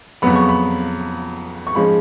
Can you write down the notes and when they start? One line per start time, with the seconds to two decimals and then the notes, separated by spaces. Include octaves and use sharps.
0.22 F2 C#3 F#3 B3 B5
0.36 C#6
0.49 B5
1.67 C#6
1.75 G#2 F3 G#3 C#4 B5